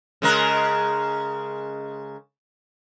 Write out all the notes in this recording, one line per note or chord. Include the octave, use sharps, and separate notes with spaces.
C#3 G#3 A#4